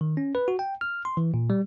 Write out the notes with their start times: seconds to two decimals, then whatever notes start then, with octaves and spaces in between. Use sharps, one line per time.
0.01 D#3
0.17 C#4
0.35 B4
0.48 F#4
0.59 G5
0.81 F6
1.05 C6
1.17 E3
1.34 A#2
1.50 G3